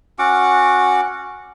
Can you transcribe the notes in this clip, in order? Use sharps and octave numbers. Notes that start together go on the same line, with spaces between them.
C#4 F#4 F#5 D6